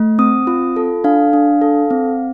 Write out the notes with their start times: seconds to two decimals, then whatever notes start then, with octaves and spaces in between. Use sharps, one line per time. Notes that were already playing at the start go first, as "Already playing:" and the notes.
Already playing: A3
0.19 C4 D#6
0.47 F4
0.76 A4
1.04 D4 F5
1.33 D4
1.61 A4
1.90 C4